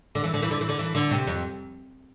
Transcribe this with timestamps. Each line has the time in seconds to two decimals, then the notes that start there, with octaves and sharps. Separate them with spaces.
0.15 D3
0.24 E3
0.34 D3
0.42 E3
0.51 D3
0.61 E3
0.69 D3
0.79 E3
0.95 D3
1.11 C3
1.27 F2